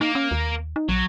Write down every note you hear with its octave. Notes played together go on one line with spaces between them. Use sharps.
A#3 D#4
C#4
D#2
D#4
A#1 F#3